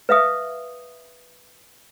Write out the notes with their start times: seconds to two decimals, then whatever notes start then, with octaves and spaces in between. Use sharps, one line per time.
0.09 B4 E5 F5 D#6